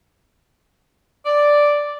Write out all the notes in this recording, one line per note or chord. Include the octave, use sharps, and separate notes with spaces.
D5